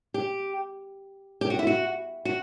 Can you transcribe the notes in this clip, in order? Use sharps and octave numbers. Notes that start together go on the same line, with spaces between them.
G4
G4
F#4
E4
F#4
F#4